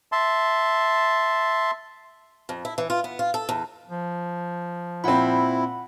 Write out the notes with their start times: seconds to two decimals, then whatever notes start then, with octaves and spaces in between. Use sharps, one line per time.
0.12 E5 A5 C6
2.49 F2
2.65 E4
2.78 E3
2.90 F4
3.04 B3
3.19 F4
3.34 A4
3.49 E2
3.89 F3
5.04 A#2 C4 E4 F#5 B5